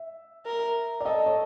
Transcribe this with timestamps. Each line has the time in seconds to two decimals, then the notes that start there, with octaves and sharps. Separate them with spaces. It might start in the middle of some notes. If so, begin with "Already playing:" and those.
Already playing: E5
0.46 A#4
1.01 D5
1.05 A4 D#5
1.26 C#5